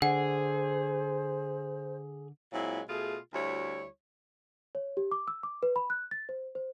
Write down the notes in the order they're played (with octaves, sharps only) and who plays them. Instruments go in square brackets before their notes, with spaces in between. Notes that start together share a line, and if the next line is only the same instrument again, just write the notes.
[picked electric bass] D3 [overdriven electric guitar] G#4 [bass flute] C5 [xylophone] F#5
[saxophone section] A#2 F#3 G#3 C4 E4
B2 A3 F4 G#4
D2 G3 E4 F#4 C#5
[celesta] C#5
G4
D6
E6
D6
B4
B5
F#6
A6
C5
C5